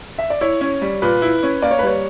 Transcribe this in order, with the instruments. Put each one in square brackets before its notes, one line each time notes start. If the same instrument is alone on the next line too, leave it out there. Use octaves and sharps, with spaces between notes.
[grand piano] E5
D5
[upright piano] E4 [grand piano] C#5
[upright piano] C#4
G3
[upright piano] A#2 [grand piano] B4
[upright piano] E4
C#4
[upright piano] A#3 [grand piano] D5
[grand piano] C#5
B4
[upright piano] G3 [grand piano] C#5